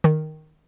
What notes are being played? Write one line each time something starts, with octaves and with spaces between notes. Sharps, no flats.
D#3